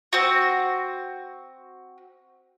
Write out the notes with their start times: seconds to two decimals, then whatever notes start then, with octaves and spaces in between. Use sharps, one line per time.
0.13 C4 F#4